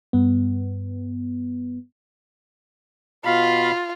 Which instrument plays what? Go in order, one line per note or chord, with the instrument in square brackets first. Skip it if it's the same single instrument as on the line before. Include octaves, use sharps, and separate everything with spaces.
[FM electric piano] G2 B3
[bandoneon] B2 F5 B5 [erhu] F4